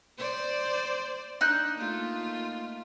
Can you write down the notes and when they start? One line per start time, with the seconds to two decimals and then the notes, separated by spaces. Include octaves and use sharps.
0.18 C5 D5
1.41 D4 D#4 F#6
1.78 A3 A#3 F4